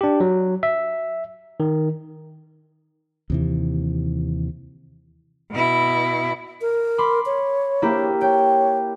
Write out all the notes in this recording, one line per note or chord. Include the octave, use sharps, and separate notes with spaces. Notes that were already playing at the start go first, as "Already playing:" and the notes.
D4 G4
F#3
E5
D#3
D#2 C3 E3
B2 E4
A#4
B5 C6 D6
C#5
A#3 E4 G4
C#5 G5